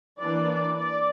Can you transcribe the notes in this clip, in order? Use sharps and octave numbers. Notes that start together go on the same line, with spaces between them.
E3 A#3 D4 D5
D5
D5